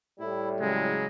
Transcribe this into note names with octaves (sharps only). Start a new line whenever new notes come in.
A2 G3 E4
C#3 F#3 G#3